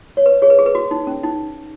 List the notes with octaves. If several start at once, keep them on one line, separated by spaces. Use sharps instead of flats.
C#5
B4
G#4 C#5
B4
G#4
B4
F#4
D#4
C#4
D#4